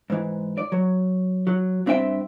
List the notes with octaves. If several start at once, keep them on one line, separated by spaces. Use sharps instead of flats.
G#2 E3
D5
F#3
F#3
G2 C4 E4 E5 G5